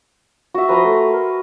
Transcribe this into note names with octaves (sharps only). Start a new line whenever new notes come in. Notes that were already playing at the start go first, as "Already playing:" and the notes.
F#4 E5
F3 B4 A#5 C6
A3
A#4